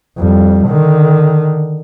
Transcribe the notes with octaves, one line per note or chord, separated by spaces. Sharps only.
F2 G3
D3 D#3